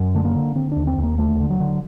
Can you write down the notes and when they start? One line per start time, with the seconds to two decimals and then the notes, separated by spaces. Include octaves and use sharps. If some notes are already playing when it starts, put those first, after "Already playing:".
Already playing: F#2
0.15 D3 A3
0.25 A#3
0.35 D3
0.55 D3 C4
0.72 D#2 D4
0.87 C4
0.98 D#2
1.03 A#3
1.18 D2 A3
1.40 D3
1.50 F#3
1.60 D3